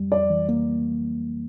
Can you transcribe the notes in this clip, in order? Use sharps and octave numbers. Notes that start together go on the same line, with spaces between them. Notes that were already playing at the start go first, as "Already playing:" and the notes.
Already playing: F2 G3
F2 D5
E3
A#3